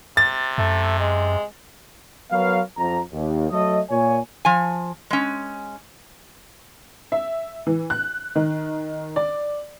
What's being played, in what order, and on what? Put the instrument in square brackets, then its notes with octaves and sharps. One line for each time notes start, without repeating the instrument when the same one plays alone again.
[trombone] C3 [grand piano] A6
[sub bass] F#2 [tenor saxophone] A3
[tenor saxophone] G#3
[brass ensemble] F#3 B3 A#4 B4 C#5 F5
F2 A#5
D#2
F#3 A3 A4 D#5
A#2 C#5 G#5
[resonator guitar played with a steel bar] F3 G#5
G#3 C#4
[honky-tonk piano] E5
E3
F#6
D#3
D5